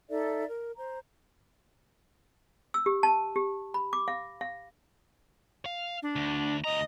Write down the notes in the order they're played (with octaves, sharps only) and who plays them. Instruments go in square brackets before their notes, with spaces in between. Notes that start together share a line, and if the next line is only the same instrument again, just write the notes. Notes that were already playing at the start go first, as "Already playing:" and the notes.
[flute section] D#4 A4 D5 E5
A#4
C5 A#5
[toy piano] E6
G4
A5
G4
B5
D6
F5
F5
[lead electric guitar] F5
[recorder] D4
[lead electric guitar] D2
[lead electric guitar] D2 A#5 [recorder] D#5